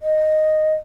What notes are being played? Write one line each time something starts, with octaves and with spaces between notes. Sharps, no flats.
D#5